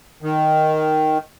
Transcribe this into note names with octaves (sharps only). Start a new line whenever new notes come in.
D#3